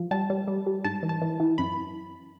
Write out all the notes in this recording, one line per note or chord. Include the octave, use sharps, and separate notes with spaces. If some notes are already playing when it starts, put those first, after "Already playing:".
Already playing: F3
G3 A5
G3
G3
G3
G#2 A5
E3
A5
E3
E3
F#2 B5